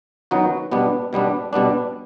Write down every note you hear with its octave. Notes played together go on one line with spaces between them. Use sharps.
D#3 F#3 B3 D#4 F#4
B2 G3 B3 D4
B2 G3 B3 D4
B2 G3 B3 D4